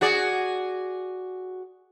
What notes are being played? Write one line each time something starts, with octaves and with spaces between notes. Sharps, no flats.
F#4 G#4 D5